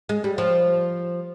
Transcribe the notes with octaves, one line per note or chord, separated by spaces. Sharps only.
G#3
G3
F3